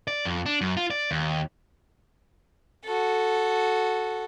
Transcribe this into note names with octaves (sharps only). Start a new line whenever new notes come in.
D5
F2
D4
F#2
F4
D5
D#2
F#4 A4